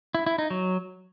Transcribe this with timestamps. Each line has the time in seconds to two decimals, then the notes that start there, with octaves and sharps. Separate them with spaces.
0.15 E4
0.26 E4
0.38 D#4
0.50 F#3